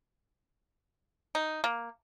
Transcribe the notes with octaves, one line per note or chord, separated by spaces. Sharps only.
D#4
A#3